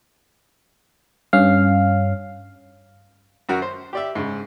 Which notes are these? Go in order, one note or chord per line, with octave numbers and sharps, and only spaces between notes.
G2 C#4 F5
F#2 F#4 A#4
C5
G4 D5 E5
G#2 C#3